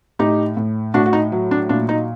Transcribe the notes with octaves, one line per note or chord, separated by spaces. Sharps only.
A2 D#4 G4
A2
A2 D4 F#4
F#4
D#4
F#3
D4
A#2 D4
D#4